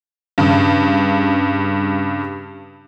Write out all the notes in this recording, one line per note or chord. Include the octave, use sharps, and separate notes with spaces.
G2 C#3